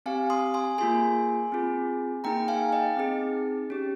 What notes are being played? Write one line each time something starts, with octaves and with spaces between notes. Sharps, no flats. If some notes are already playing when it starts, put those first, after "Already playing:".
C4 G4 F5 G#5
C6 D#6
G#5 C6
A#3 F4 G#4 G#5 C6
C4 F4 G#4
A#3 D#4 G#4 G5 A#5
F5 G#5
D#5 G5
C4 D#4 G#4
C#4 G4